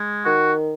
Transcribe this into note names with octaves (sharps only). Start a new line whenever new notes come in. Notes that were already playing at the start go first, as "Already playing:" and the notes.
Already playing: G#3
D#3 F#4